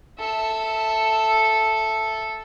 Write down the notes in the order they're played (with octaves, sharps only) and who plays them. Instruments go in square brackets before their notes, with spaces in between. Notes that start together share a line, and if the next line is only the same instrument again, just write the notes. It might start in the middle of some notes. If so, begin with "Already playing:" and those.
[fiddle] A4 E5